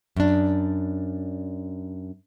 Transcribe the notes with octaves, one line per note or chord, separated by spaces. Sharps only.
F#2 D4